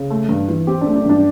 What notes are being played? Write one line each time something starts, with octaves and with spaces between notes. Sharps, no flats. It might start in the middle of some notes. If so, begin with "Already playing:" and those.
Already playing: C#3
A3
G2
E3
C4 G4
D4
A3
D4
G2 D4